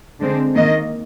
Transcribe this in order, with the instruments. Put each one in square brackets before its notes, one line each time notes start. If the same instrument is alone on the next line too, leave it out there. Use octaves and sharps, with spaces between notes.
[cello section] D3 G#3 C4
D#3 A#3 D#5